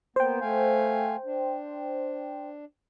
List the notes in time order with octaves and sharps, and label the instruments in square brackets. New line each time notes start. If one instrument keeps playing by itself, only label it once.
[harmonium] A#3 B3 [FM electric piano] C5 G5
[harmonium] A3 F5 G#5
D4